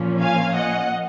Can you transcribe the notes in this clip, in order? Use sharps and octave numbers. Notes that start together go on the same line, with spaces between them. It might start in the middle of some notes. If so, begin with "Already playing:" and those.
Already playing: A#2 F3 A#3 C#4
F5 G#5
D#5 F#5